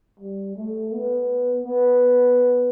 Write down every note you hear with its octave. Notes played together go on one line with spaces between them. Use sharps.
G3
A3
B3
B3